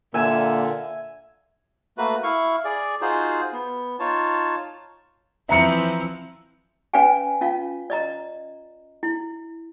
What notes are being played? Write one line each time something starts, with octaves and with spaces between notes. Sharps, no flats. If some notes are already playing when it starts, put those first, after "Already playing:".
A#2 D3 A#3 E5 G#5
A3 A#3 F#4 B4
E4 F5 C#6
G#4 D5
D#4 F4 F#4 G#4 C5
B3
D#4 F4 C#5 A5
E3 F3 C4 E5 A#5 C#7
C#4 B4 D5 F5 G5 G#5
C#4 F4 F5
D5 D#5 A#5
E4